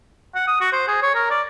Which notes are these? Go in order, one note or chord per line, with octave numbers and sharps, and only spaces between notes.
F#5
D#6
F#4
C5
G#4
C#5
A#4
D5